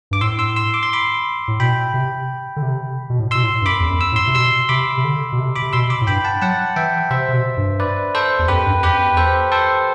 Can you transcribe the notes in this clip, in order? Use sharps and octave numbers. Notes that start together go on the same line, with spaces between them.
G2 D6
A2 C6 E6
C6 E6
C6 E6
D6
C6
B5 D6
A2
B2 G5 B5
C3
D3
C3
B2
A2
B2 C6 E6
A2
G2
F#2 B5 D6
E2
F#2
E6
A2
C6 E6
C3
B2 C6 E6
C3 B5 D6
C3
D3
B2
C3
B5 D6
C3
B2 C6 E6
B5 D6
A2
G2 G5 B5
F#5 A5
F#3 F#5 A5
E3 E5 G5
C3 C5 E5
C3
B2
G2
B4 D5
A4 C5
E2
F#2 G4 B4
G2
F#2
E2 G4 B4
A4 C5
A4 C5